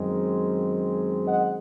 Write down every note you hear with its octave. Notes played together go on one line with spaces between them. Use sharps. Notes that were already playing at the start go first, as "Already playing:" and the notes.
Already playing: F#2 D#3 G#3 C4
D#5 F#5